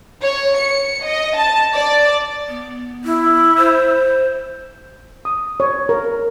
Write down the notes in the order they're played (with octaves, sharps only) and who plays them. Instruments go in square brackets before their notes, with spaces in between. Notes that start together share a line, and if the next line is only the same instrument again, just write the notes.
[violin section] C#5
C#7
D#5
A5
D5
[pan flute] B3
[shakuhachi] E4
[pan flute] C5
[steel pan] D#6
C#5
A#4